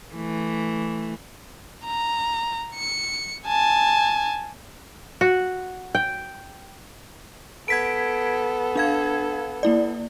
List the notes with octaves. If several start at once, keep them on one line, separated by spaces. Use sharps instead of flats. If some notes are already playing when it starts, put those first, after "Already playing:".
E3 A3
A#5
C#7
G#5 A5
F#4
G5
B3 A4 G#6 B6 D7
D4 F5 G#6
A#3 E4 D5